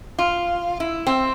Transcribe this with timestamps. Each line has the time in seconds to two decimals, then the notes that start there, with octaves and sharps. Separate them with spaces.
0.19 F4
0.80 E4
1.07 C4